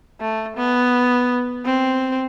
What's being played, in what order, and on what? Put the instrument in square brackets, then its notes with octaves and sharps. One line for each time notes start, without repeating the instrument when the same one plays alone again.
[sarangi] A3
B3
C4